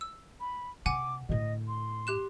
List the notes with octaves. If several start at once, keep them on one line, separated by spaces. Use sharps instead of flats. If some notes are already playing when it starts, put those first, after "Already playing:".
E6
B5
C3 F#5 G#5 D6 D#7
A2 D3 D#5
C6
G4 F#6 E7